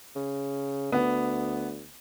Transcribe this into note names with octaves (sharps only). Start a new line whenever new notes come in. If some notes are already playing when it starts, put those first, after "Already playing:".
C#3
D2 B3